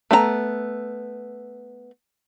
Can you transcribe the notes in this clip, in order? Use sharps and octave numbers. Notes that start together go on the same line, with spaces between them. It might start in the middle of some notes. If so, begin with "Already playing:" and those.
A3 B3 G#4 A#5